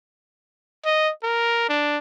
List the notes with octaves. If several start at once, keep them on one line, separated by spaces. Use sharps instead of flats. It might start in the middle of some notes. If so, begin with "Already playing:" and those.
D#5
A#4
D4